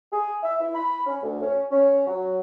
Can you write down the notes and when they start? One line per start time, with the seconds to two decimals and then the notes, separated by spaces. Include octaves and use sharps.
0.12 G#4
0.43 E5
0.60 E4
0.75 B5
1.06 C#4
1.22 D2
1.42 C#4
1.71 C#4
2.07 F#3